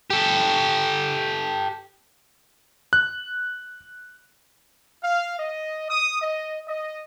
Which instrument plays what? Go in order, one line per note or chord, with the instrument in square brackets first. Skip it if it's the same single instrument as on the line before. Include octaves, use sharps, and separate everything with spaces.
[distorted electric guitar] G4 A4
[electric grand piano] F#6
[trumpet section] F5
D#5
D#6
D#5
D#5